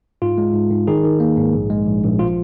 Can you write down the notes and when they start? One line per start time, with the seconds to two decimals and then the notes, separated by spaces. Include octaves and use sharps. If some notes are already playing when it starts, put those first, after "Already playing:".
0.22 G#2 F4
0.38 G#3
0.54 G#2
0.71 G#2
0.87 D#3 D#4 G#4
1.04 D#3
1.20 A#3
1.37 G#2
1.54 A#1
1.70 G#3
1.87 A#1
2.03 A#1
2.19 F3 F4